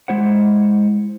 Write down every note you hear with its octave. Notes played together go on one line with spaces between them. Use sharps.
G#3 E4 C5 F#5